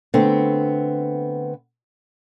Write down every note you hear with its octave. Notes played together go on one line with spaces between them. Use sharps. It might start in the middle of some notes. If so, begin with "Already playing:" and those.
D3 A3 B3 C4